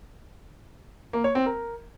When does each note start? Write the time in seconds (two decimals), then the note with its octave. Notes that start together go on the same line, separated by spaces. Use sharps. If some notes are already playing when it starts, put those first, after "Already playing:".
1.13 A#3
1.24 C#5
1.35 C4
1.46 A#4